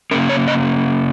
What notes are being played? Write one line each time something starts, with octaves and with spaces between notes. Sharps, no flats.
C#3 A#3 C#4 A#4
C#5
D#5